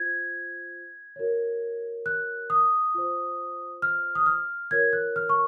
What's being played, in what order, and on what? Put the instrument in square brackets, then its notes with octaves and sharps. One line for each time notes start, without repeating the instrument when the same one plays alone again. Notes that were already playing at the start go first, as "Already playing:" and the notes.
Already playing: [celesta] F4 C5 G#6
F#4 A#4 C#5
F#6
D#6
F4 C5
F6
D#6
F6
F4 A#4 C#5 G#6
F#6
F6
C#6